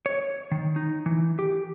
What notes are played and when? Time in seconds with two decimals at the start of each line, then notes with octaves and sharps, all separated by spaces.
0.06 C#5
0.51 D#3
0.76 D#4
1.06 E3
1.39 G4